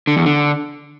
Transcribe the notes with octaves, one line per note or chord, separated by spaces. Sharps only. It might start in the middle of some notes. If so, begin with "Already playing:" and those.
D3
E2
D3